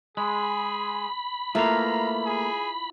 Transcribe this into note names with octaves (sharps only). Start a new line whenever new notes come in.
G#3 G#4 B5
A3 A#3 E4 F4 B4 F5 A#5
G#4